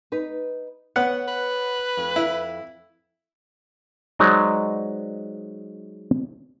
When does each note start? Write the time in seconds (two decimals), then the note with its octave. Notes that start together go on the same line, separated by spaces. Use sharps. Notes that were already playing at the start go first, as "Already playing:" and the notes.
0.12 D#4 B4
0.96 B3 C#5 F#5
1.28 B4
1.97 F2
2.16 E4
4.19 F#3 G#3 D#4 C5 D5 D#5